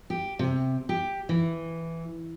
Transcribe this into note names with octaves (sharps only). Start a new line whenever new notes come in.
G4
C3
G4
E3